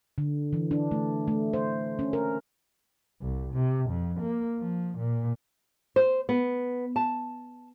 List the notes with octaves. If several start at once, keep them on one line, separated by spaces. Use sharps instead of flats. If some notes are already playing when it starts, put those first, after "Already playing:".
D3
E3
D4
A3
A3
C5
C#4
A#4
C2
C3
F2
A#3
F3
A#2
C5
B3
A5